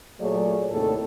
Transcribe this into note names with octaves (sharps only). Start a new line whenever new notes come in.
A#2 F#3 A3 G#4 C#5 D5
D#2 A2 C3 A3 A4